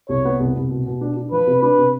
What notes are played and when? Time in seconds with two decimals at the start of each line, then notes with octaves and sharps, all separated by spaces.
0.09 C2 C#5
0.25 B3
0.40 C2
0.56 C2
0.70 B2
0.86 B2
1.01 D4
1.17 D4
1.32 F3 B4
1.47 C3
1.62 D4 B4
1.78 C3